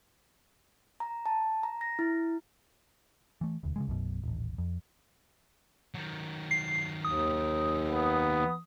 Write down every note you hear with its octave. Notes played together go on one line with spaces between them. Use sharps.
A#5
A5
A#5
A#6
E4
E3 A3
E1 D2
C#3 E3 G#3
B1 F#2 B2
D#1 A1
F2
D#3 F#3
C7
D#2 D#6
B3